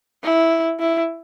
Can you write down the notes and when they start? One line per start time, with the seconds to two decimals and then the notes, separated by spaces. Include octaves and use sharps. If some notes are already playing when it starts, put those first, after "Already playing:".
0.23 E4
0.80 E4